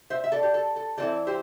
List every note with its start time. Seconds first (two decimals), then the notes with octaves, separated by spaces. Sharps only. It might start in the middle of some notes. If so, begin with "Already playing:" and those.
0.10 C5 E5
0.24 E5
0.32 A4 D5
0.43 G4
0.54 A4
0.76 A4
0.98 E3 C4 E4 A4 D5
1.27 G4 C5